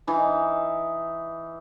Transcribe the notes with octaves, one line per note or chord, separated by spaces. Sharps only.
E3 D#4